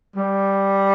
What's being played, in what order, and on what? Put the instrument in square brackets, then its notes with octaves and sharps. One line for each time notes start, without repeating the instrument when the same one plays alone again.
[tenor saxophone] G3